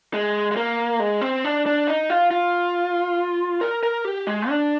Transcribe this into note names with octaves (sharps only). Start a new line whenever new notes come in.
G#3
G#3
A#3
G#3
C4
D4
D4
D#4
F4
F4
A#4
A#4
G4
G#3
D4